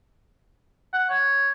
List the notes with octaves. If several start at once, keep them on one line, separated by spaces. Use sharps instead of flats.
F#5
C#5